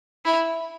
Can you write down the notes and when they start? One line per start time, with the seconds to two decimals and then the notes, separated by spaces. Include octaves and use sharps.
0.25 E4